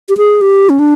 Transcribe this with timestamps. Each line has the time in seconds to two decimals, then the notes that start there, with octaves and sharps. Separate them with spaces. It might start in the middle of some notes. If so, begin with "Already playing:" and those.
0.09 G4
0.17 G#4
0.41 G4
0.69 C#4
0.79 D4